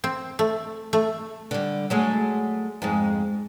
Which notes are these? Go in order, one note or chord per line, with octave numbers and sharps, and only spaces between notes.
C4
A3
A3
D3 G3
F#3 G#3 A3
F2 G#2 G#3